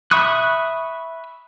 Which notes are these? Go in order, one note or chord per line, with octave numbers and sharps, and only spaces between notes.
E5 B5 C#6 D#6 F#6